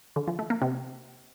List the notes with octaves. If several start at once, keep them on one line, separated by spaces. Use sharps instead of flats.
D3
F3
A3
A#3
C3